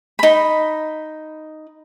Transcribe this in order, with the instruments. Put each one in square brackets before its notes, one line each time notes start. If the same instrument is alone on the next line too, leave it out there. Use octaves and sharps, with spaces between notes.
[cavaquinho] D#4 B5